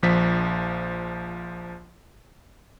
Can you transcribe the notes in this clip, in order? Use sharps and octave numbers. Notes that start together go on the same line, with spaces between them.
A#1 F3 B6